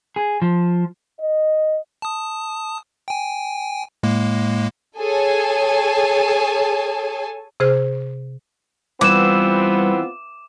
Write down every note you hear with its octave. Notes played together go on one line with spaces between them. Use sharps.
G#4
F3
D#5
A5 D#6
G5 G#5
A2 G#3 A#3
G#4 A4 C#5 G#5 A5
C3 G#4 C5 F6
E3 G3 B3 C4 F4 D6 E7